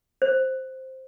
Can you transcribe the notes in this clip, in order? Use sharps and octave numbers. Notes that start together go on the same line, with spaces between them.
C5